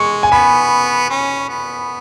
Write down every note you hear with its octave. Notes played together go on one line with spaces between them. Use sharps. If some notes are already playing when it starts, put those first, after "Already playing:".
Already playing: G#3 C#6
G#5
B3 B5
C#4
B3